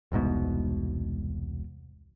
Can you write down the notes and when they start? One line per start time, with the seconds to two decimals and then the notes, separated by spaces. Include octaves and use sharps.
0.12 E1 C2 G#2 B2